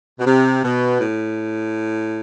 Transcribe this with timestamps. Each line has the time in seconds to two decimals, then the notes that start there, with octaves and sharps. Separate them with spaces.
0.20 B2
0.26 C3
0.64 B2
1.01 A2